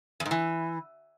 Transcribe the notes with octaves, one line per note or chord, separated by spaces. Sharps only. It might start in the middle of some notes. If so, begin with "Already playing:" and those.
E2
G#2
E3